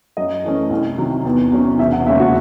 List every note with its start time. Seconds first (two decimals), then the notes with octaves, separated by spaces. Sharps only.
0.17 F#2 D#5
0.44 E3 A3 C#4
0.70 C2
0.98 C3 D#3 F#3
1.25 E2
1.52 C3 F#3 C#4
1.79 E1 E5
1.92 F#5
2.06 D#2 C#3 G#3 C#4 E5
2.20 F#4